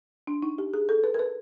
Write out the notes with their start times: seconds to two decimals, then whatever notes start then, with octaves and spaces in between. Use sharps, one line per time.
0.27 D4
0.43 D#4
0.58 G4
0.74 G#4
0.89 A4
1.04 B4
1.14 A#4
1.19 B4